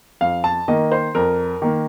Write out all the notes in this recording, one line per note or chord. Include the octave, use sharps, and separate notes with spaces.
F2 F5
A5
D#3 A#3 D#5
C5
F2 A#4
D#3 A#3